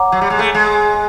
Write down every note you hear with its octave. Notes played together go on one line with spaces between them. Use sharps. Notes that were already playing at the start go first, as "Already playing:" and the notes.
Already playing: C#5 F#5 A#5 D6
F#3
G3
G#3
A3
G#3